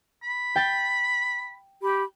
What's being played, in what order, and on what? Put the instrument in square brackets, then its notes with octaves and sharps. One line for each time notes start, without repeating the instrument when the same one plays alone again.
[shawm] B5
[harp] G5 A6
[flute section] G4 B5